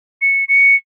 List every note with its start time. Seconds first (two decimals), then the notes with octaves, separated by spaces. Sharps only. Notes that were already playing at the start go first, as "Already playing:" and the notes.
0.21 C#7
0.48 C#7